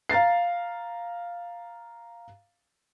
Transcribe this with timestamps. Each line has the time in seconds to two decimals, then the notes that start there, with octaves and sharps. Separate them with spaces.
0.09 F5 A#5 A6 C7